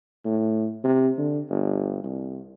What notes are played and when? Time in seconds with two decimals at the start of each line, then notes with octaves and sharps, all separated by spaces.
0.25 A2
0.84 C3
1.18 D3
1.50 G1
2.04 C2